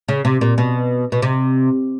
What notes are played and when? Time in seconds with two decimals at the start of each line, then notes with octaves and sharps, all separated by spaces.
0.08 C#3
0.25 C3
0.41 A#2
0.58 B2
1.12 B2
1.22 C3